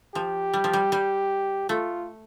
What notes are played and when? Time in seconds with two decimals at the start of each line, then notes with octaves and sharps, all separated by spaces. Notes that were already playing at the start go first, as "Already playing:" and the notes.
0.14 F3 G4
0.54 G3
0.64 F3
0.73 G3
0.92 G3
1.69 A3 F4